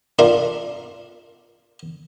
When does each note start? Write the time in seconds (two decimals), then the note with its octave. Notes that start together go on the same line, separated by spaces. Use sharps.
0.19 D4 F4 A#4 F5